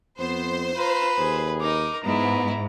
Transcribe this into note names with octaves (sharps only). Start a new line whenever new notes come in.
F2 B3 C5
F4 B4 A#5
D#2 G#4
D#4 A#4 D6
G#2 B3 E4 A#5